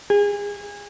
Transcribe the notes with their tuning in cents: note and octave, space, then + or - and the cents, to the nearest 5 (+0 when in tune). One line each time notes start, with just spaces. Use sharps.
G#4 -30